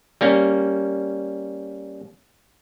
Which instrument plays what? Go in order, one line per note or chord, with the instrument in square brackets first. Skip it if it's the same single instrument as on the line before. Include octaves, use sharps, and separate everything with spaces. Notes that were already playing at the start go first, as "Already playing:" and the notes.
[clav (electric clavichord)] G3 A#3 C#4